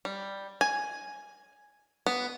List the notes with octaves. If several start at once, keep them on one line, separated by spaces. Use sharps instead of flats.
G3
G#5
B3